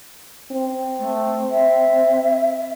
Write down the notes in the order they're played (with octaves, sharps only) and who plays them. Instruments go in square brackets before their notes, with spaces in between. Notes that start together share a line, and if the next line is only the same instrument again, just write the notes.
[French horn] C4
[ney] A3
E5